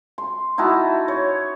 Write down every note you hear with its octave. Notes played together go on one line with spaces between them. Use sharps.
C6
D#4 E4 F#4 A5
C#5